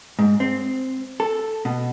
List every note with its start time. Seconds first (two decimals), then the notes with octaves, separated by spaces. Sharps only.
0.19 G#2
0.40 C4
1.20 A4
1.65 B2